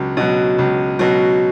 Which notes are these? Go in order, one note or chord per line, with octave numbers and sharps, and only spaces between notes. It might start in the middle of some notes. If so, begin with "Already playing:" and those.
Already playing: C#2 B2 F#3
B2 F#3
C#2
B2 F#3